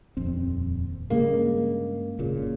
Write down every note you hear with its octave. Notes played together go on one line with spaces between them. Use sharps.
D#1 F2 C4
G2 C#3 G#3 A#3
F#1 A#2 C#3